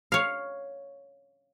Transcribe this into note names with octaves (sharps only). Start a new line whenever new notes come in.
C#5 F5